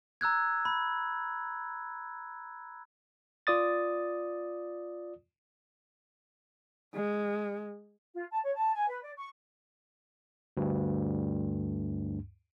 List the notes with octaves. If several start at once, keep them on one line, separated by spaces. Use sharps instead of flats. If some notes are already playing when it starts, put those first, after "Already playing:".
A#5 E6 F#6 G#6
B5
F4 D5 D#6 A6
G#3
F4
A5
C#5
A5
G#5
B4
D5
C#6
D2 G2